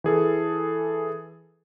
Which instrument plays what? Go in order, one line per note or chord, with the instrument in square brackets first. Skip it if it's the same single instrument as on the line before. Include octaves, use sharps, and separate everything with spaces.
[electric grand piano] E3 G#4 A4